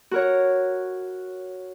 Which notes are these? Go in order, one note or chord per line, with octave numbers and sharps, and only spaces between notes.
F#4 A#4 C#5